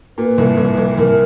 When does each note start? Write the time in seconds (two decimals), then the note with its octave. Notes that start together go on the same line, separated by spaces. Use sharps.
0.18 A#2 B4
0.38 C2
0.57 C2
0.77 C2
0.97 C2 A#4